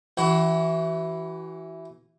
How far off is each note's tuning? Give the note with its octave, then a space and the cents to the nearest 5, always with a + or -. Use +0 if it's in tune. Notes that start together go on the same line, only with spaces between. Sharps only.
E3 +0 F#4 +35